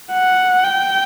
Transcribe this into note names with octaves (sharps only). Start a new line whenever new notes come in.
F#5
G5